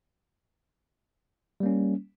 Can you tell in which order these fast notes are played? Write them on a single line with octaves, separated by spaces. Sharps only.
G3 A#3 C#4